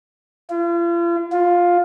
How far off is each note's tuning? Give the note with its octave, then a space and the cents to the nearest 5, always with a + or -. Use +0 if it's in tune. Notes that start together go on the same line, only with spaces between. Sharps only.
F4 -40
F4 +10